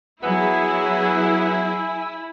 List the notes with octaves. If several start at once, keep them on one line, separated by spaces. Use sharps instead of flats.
F#3 B3 E4 G#4 G#5 E6